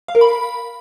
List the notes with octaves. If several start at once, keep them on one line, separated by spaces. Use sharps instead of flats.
F5
A#4
B5